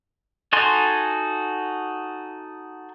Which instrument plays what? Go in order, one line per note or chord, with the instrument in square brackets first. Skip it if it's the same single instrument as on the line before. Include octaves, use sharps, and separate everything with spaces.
[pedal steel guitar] D#4 F#4 A4 G#5 C6